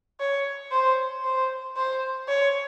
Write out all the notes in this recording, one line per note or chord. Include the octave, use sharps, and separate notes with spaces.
C#5
C5
C5
C5
C#5